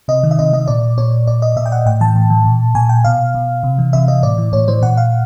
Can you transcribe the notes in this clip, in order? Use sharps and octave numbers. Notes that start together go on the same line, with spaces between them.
C3 D#5
D#3
E5
C3 D#5
D#3 D#5
A#2 D5
A#2 C#5
A#2 D5
D#5
A#2 E5
G5
F#5
A2 G5
E3 A5
A2
E3
A#2
A#2 G#5
G5
B2 F5
B2
C3
E3
C3 E5
E3 D#5
A2 D5
E3
A2 C#5
E3 C5
A#2 F#5
F5